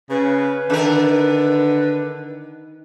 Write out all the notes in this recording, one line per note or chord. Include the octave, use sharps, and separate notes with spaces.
C#3 B4
D3 D#3 A#4